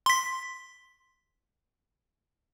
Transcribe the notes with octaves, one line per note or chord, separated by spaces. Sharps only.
C6 B6